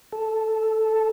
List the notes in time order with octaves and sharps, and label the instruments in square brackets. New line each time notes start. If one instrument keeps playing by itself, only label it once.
[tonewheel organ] A4